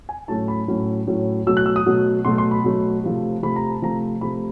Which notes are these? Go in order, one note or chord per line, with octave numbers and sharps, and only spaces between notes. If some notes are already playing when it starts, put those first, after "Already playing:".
G#5
A2 F#3 A3 C#4 A5
B5
A2 F#3 A3 C#4
A2 F#3 A3 C#4
B2 F#3 A3 E6
F#6
E6
D#6
B2 F#3 A3
B2 F#3 A3 C6
C6
B5
B2 F#3 A3
C3 F3 A3
C3 F3 A3 B5
A#5
A5
C3 F3 A3 A#5
C3 F3 A3 B5